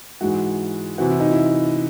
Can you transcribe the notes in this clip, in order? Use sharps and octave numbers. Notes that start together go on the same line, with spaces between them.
G#2 E3 G#3 F#4
C3 E3 C4 F#4
E4
D#4
E4